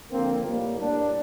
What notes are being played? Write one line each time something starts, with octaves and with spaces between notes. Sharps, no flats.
D3 F3 A#3 C4
A2 G3 A#3
A2 G3 A#3 D4